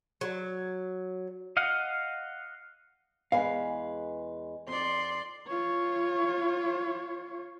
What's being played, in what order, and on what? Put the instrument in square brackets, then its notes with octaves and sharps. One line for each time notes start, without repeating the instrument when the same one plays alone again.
[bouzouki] F#3
[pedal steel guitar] D#5 F5 F#5
[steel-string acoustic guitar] E2 G#3 B4 [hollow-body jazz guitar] F5
[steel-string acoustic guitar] F2 [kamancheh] D5 C6
[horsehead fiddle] F4 C#5